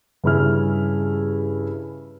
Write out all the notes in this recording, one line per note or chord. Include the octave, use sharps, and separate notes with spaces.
G2 C#3 C#4 E4 G#4 F6